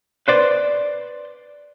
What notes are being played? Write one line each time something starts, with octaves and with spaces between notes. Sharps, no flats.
B4 C5 D5